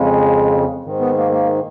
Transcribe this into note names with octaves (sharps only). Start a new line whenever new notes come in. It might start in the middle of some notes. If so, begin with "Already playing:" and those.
Already playing: F2 C#3 G#3
G#2 D#3
B3
A#3
A#3